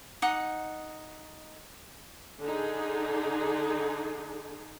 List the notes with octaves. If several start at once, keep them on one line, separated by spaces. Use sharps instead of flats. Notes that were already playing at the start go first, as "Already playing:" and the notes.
D#4 F#5 D#6
D3 D4 D#4 G#4